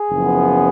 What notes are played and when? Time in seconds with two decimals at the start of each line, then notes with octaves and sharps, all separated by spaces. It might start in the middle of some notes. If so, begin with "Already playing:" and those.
Already playing: G#4
0.10 F#1 F#2 F3 B3